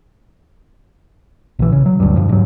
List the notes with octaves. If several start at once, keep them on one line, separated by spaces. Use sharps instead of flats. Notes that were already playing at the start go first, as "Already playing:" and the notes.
A#1 E3
C#3
F#3
D2 G2
G2 F3
G#2 F#3